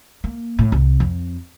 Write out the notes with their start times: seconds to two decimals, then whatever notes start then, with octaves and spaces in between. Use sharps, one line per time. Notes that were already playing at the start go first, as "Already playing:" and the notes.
0.24 A#3
0.59 A2
0.72 C2
1.00 F2